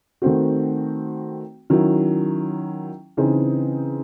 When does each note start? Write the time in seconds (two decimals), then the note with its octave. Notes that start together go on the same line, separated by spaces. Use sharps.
0.22 D#3 A3 C4 F#4
1.70 D#3 F#3 C#4 E4
3.17 C#3 E3 C4 D#4 G#4